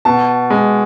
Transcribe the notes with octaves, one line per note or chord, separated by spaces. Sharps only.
B2 A5
G#3